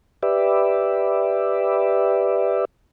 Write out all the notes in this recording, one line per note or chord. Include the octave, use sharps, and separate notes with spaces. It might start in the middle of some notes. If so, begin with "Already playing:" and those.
G4 B4 D5 E5